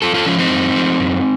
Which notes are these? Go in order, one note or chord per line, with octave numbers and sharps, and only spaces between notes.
F#2 F4 A4
F4 A4
F3 C#4 F4
C4 D#4
F#2
F3
F#2